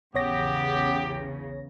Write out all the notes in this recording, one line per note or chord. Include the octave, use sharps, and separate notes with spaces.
A#1 E2 C#3 B3 G4 C#5 A#6